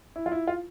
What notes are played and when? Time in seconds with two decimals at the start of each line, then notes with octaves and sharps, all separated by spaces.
0.16 E4
0.26 F4
0.32 E4
0.47 F4